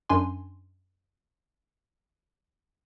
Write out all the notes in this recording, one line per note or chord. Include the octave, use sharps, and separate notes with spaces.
F#2 D4 G#5 C6